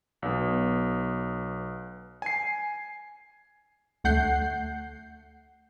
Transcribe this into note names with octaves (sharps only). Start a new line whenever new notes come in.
B1 B3
G#5 C7
D2 A3 F#5 G6 C7